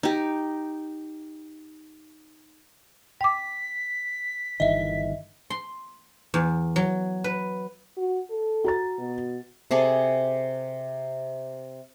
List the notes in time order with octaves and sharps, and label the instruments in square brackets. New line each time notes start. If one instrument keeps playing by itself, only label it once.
[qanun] D#4 G4
[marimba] G5 D6 [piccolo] B6
[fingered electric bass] G1 D#3 E3 [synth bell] D#5 E5
[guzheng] C6
E2
F#3
B4
[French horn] F#4
A4
[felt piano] F#4 A#5 A6
[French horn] B2
[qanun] C3 G#4 A4 D5